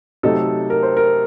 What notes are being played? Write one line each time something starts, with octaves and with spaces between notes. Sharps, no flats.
C3 F#3 A3 D#4 A4
A#4
C5
A#4